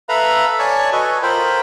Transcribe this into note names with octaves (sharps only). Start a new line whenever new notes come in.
A4 B4 E5 F5 A#5 B5
C#5 D5 G#5 A5 C#6
F#4 A4 B4 D#5 G#5
F4 A#4 C5 G5 B5